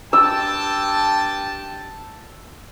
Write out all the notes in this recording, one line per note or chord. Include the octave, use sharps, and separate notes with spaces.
G2 G5 A5 E6